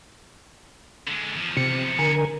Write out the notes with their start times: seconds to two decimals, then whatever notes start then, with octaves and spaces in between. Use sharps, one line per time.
1.07 D3 G#3
1.36 E2 F3
1.57 C3 C#7
1.99 D3 A#4 G#5